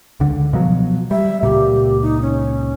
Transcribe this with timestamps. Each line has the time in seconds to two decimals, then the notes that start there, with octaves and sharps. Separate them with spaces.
0.20 C#2 D3
0.53 B2 F3 F#3
1.11 G3 E5
1.43 C#2 A#2 G4
2.02 D#4
2.22 C#4